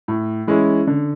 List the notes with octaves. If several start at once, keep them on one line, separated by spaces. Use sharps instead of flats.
A2
E3 G#3 C#4 E4
D3